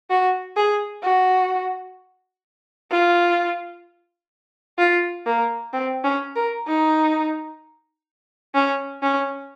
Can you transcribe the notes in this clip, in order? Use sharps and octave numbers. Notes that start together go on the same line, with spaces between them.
F#4
G#4
F#4
F4
F4
A#3
C4
C#4
A#4
D#4
C#4
C#4